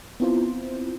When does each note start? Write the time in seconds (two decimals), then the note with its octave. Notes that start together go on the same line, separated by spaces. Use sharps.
0.20 B3 C4 E4 F4 C5